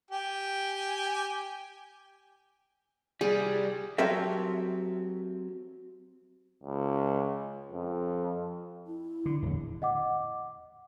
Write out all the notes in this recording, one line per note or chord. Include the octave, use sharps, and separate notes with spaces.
G4 G5 G#5
C2 G3 G#4
F#3 C4 G4 A4 A#4 E5
C#2
F2
E4
D3
D1 E2
D#5 F#5 D6